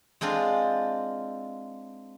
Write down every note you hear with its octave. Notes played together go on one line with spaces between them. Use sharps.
G#3 C4 D4 F4